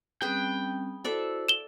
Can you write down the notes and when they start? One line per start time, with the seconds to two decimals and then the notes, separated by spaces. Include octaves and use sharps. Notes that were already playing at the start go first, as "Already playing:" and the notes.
0.22 G3 C4 C#4 G#4 B4 G5
1.04 E4 F#4 A4 C5 D5 E5
1.48 E7 G7